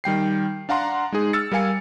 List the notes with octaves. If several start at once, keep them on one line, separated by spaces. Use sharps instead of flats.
D#3 G3 G5 C7
D4 F5 F#5 A#5 C6
G#3 D#4 G#4
E6 F6 A6 C#7
G3 A#4 F5 G#5 C#7